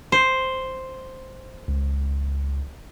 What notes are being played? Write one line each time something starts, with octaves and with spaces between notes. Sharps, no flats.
C5
C#2